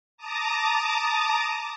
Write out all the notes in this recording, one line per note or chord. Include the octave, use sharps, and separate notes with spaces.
A5 A#5 D6 D#6